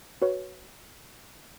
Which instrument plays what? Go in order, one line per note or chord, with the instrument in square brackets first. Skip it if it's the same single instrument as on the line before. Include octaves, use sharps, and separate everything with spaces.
[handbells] F#4 B4 C#5